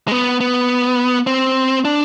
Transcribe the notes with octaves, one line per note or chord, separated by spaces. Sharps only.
G#3
B3
B3
C4
D4